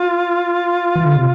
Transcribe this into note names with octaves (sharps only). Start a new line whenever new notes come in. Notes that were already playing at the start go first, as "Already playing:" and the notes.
Already playing: F4
E3
D3
C3